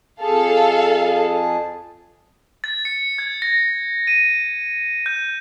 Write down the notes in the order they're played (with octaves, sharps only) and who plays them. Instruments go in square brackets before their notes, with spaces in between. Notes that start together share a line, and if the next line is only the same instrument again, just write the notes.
[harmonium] F2 G#4 A5 [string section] A4 F5
[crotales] A6
C#7
G#6
A#6
D#7
G6